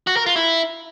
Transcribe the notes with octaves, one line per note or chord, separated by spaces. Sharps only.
F#4
A#4
F4
E4